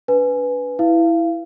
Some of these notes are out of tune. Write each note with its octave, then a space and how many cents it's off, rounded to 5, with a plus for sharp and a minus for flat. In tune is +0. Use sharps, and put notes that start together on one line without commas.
D4 -40 B4 +0 G#5 +5
E4 +0 F5 -25